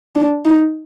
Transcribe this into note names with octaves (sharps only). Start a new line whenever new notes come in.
D4
D#4